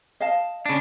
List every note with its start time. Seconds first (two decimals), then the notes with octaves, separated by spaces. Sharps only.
0.20 D#5 F5 A5
0.66 C#3 D4